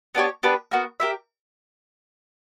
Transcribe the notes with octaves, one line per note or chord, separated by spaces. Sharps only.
B3 D4 G4 C#5
B3 D4 G4 B4
B3 F#4 A#4
G4 A#4 E5